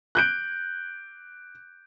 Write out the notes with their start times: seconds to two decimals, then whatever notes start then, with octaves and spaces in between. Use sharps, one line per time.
0.15 F#6 G6 D7